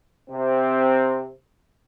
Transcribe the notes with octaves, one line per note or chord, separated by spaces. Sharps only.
C3 C4